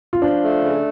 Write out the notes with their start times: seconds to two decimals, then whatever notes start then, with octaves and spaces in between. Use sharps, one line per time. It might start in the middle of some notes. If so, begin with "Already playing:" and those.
0.13 F4
0.22 F3 D4
0.43 A3
0.63 C#3